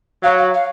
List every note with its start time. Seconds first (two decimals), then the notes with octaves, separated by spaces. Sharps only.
0.23 F#3 F5
0.39 F5
0.54 F5